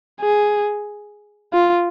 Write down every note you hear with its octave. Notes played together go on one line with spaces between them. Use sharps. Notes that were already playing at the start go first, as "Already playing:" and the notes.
G#4
F4